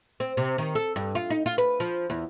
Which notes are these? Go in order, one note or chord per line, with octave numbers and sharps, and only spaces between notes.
C4
C3
D#3
A4
G2
F4
D#4
F4
B4
F3
E2